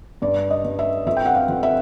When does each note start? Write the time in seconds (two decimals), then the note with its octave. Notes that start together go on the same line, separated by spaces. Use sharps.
0.22 G2 D5
0.50 D#5
0.65 G2
0.79 E5
1.06 F2 E5
1.17 G5
1.25 F#5
1.35 F5
1.48 F2
1.63 E5